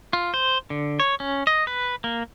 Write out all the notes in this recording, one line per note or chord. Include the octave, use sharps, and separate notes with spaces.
F4
C5
D3
C#5
C#4
D#5
B4
A#3